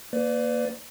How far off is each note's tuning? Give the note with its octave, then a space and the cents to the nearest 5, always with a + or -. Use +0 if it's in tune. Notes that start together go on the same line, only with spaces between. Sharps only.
A#3 +0 B4 +35 D5 +0